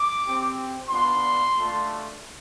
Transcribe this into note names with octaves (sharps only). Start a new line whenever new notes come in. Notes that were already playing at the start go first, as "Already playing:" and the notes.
Already playing: D6
C4 G4
B3 D4 F4 C6
A3 D4 F4